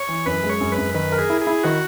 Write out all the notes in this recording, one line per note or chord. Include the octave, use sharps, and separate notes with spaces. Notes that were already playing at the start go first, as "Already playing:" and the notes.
Already playing: C#5
E3
F#2 B4
G#3
C#5
F#2
B4
F#2
D#3 B4
A#4
G#4
E4
G#4
E4
D#3 F#4